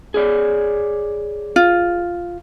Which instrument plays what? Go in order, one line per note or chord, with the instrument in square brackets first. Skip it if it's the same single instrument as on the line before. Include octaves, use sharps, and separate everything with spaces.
[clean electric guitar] G#4 C#5 D5
[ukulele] F4